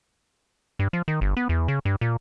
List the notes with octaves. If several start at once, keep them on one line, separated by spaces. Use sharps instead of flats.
G2
F3
D#3
G1
B3
E2
C#3
G2
A#2